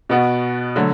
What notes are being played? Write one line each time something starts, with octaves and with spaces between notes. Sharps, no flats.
B2 B3 F#4
D3 F#3 A3 F#4